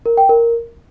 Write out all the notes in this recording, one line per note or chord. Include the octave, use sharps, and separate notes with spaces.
A#4
G5
A#4